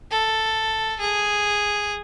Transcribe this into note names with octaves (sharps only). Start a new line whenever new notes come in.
A4
G#4